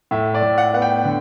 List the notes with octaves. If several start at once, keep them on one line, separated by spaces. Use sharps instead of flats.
A2 E5
D5
A2
F#5
B3 F#5
G5
D3